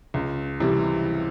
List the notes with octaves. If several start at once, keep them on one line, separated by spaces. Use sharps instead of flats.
C#2
C3 E3 G3